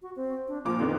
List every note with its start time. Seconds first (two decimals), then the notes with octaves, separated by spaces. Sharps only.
0.02 F#4
0.16 C4
0.48 D4
0.65 A#2 F3 D6
0.79 F2 D3 D#3 B3